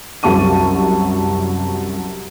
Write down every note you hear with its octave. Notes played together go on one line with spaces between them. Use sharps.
C2 F#2 A5 C#6 D#7